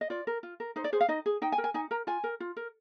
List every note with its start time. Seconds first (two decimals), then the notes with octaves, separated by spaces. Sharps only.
0.01 D#5
0.10 F4 D5
0.27 A#4
0.43 F4
0.60 A#4
0.76 D#4 C5
0.84 D5
0.93 G#4 C5
1.01 F5
1.08 D#4 D#5
1.26 G#4
1.42 D#4 G5
1.52 G#5
1.58 A#4
1.64 G#5
1.74 D#4 G#5
1.91 A#4 A#5
2.07 F4 G#5
2.24 A#4
2.40 F4
2.57 A#4